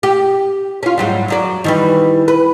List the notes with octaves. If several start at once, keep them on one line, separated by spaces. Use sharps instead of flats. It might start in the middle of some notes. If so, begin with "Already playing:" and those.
G4
C#4 F4
G#2 F#3 G3
F#2 F#3 D5
D#3 E3 G3
B4